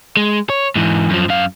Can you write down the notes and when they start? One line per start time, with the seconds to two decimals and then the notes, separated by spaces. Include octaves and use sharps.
0.17 G#3
0.50 C#5
0.76 G#2 E3
1.10 F#2 F3
1.29 F#2 F5